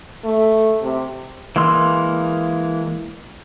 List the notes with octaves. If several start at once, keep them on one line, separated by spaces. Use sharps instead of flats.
A3
C3
E3 G#3 A#3 C6 E6